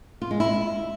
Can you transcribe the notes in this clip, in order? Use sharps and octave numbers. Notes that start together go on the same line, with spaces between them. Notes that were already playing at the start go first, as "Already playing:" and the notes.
F4
G#3
E4